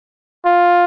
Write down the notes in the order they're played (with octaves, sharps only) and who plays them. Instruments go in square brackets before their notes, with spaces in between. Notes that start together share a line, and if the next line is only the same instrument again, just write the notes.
[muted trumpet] F4